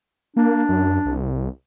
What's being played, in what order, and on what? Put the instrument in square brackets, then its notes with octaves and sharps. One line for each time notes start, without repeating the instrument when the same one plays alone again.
[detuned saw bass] A#3 [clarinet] D4
[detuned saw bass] F#2
C2